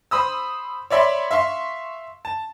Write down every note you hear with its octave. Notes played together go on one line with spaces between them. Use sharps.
C5 B5 D#6 E6
C#5 D5 E5 B5 C6
E5 F5 C6 C#6
A5